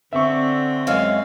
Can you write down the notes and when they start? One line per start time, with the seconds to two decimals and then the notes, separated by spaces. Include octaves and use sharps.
0.13 D3 C4 E5 C#6
0.87 F#2 G#3 F5